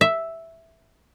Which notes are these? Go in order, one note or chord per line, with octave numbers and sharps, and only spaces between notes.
E5